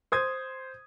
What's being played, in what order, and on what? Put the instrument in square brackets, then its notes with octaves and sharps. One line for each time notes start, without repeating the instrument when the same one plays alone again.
[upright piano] C5 D#6 G#6